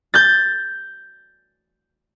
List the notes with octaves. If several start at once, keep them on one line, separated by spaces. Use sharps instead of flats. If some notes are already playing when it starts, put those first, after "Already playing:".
G6 A6